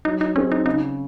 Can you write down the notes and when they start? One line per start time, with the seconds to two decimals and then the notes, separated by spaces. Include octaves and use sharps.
0.05 F#3 D#4
0.21 D#4
0.36 C4 C#4 D#4 G#4 C5
0.52 D#4
0.66 C#3 D#4